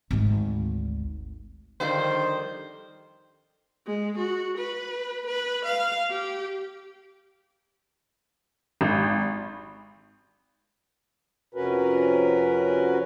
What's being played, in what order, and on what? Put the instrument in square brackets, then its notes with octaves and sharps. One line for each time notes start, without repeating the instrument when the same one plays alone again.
[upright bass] G#1 D2
[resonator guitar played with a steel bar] F2 D3 G3 [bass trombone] D#3 [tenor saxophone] C5
[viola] G#3
F#4
B4
B4
F5
G4
[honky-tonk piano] G#1
[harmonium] F2 C3 C#4 F#4 A#4 B4